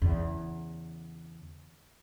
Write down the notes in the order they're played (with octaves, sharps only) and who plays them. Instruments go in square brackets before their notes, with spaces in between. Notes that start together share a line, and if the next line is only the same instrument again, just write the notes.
[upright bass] E2 C#3